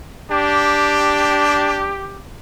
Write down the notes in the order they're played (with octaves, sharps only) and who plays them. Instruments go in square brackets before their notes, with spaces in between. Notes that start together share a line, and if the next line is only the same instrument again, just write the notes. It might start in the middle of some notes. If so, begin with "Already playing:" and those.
[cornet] D4 [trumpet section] G4